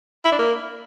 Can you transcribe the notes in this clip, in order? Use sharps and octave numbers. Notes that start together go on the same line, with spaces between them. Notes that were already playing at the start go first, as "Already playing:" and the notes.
E4
D4
A#3